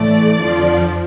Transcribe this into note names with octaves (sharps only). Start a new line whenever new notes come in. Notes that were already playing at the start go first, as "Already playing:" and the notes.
Already playing: A2 E3 A3 D5
F2 D3 F3